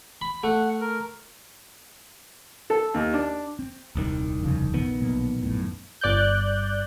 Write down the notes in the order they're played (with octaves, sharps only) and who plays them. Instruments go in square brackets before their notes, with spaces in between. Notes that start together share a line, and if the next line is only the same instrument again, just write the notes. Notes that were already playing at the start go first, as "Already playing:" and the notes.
[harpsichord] B5
[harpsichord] A3 [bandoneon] F#5
[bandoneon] A#4
[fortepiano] A4
D#2
D4
[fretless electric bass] C4
[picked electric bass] D#1 C2 D#3
[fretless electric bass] F1 C#3 F3
[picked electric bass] A#1 D#3 B3
[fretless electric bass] B1 B2 A#3
F#2 A2
[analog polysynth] G1 D5 F#6 G6